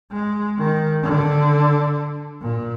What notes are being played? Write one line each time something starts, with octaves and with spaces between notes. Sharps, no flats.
G#3
D#3
D3
A#2